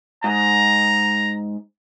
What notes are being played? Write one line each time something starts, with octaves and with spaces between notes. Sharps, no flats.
G#2 A#5